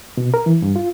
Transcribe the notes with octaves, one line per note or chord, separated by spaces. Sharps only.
B2
A#4
E3
G2
F4